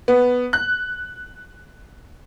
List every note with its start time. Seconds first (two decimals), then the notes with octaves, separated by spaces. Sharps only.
0.08 B3
0.53 F#6